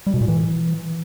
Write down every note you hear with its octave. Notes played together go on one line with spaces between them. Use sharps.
G3
B2
A#2
E3